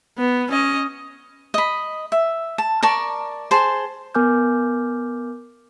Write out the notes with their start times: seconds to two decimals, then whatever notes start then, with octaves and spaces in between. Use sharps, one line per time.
0.18 B3
0.50 C#4 D#5
1.54 D#5 B5
2.12 E5
2.58 A5
2.83 A#4 D5 A5 C#6
3.51 G#4 C5 A5 C6
4.15 B3 A#4 G#5 D6 F6 G6